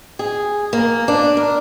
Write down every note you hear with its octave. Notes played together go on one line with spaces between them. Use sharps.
G#4
A#3
D4
A#4